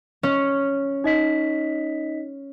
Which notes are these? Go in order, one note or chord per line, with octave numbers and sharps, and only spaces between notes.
C#4
D#4 D#5 B6